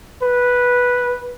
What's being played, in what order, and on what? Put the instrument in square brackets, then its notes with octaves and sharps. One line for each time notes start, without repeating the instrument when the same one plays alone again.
[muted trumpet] B4